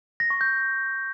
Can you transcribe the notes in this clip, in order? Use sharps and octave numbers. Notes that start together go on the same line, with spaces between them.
A#6
C#6
G6